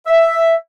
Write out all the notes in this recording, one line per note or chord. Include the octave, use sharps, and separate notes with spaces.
E5